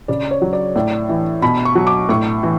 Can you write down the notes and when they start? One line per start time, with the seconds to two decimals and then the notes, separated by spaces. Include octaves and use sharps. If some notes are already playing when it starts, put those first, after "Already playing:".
0.08 C#3 D5
0.31 C#5
0.42 F#3
0.53 D5
0.76 A2 D5
1.09 E3
1.42 B2 B5
1.65 C#6
1.75 F#3
1.87 D6
2.09 A2 C#6
2.43 E3